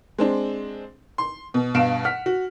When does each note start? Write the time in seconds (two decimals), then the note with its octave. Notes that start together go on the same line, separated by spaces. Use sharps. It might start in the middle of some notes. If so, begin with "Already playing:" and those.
0.18 G#3 C4 D4
1.18 C6
1.54 B2
1.74 G2 B2 F5 D7 E7
2.04 F#5 F6 B6
2.26 F#4